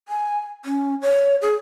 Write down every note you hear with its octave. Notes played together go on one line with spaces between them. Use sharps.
G#5
C#4
C#5
G#4